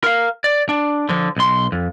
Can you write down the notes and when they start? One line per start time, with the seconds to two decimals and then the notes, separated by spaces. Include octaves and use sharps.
0.04 A#4 F5
0.44 D5
0.69 D4
1.09 D3 F3
1.36 B1 C6
1.72 F2